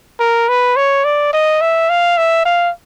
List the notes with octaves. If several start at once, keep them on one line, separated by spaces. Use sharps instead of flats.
A#4
B4
C#5
D5
D#5
E5
F5
E5
F5